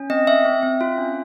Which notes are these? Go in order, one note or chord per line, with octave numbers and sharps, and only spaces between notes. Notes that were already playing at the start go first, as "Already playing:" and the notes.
Already playing: C#4
C4 D#5
C4 E5
C4
C4
F4
C#4